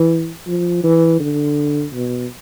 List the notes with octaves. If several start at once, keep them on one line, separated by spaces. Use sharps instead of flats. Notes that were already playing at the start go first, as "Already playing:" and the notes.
Already playing: E3
F3
E3
D3
B2